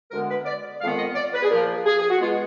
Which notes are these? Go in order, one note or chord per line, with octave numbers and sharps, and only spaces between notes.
D2 D3 G#3 B3 A#4
B4
D5
F2 D#3 G#3 B3 F5
D#5
D5
B4
G#4
A#2 F3 A#3 A#4
G#4
G#4
F#4
B2 G#3 B3 F4